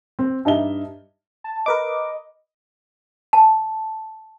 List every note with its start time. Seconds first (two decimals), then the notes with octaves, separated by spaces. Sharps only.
0.19 C4
0.45 G2 D#4 G4 D#5 E5 G7
1.44 A5
1.66 A#4 B4 D#5 D6
3.33 A5